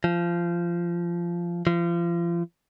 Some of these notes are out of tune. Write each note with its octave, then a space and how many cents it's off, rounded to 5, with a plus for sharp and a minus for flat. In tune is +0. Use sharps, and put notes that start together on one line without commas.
F3 -20
F3 -35